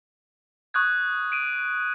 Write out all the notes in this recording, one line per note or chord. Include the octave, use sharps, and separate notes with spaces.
C#6 D#6 F#6 G#6
D7 D#7